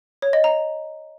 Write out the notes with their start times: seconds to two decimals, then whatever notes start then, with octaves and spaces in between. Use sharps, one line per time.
0.22 C#5
0.33 D#5
0.44 A#5